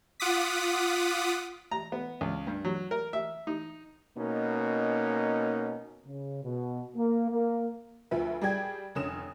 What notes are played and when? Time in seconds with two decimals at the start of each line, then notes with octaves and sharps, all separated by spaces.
0.20 F4 F#5 D6 D#6 B6
1.71 A#5
1.92 B3
2.21 C#2
2.47 G2
2.65 F#3
2.91 A#4
3.13 E5
3.47 D#4
4.18 B2 A#3 C#4 D#4
6.07 C#3
6.43 B2
6.96 A#3
7.31 A#3
8.11 D2 F3 B4 E5
8.41 G3 G#4 D5 G5 G#6
8.95 F1 D3 C#4 D#6 E7